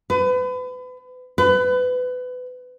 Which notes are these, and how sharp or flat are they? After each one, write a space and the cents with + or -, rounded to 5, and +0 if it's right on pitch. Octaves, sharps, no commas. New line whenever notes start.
B4 +35
B4 +25